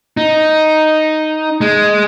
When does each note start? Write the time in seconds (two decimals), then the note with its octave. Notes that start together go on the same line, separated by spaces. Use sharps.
0.17 D#4
1.61 G#3